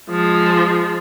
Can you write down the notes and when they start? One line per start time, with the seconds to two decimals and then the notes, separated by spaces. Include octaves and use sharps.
0.10 F3 G#3